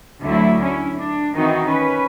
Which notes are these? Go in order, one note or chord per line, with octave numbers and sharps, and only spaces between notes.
D2 D3 F#3 A3 E4
C#4 E4
D4
D#3 E3 C4 D#4 F#4
C#4 B4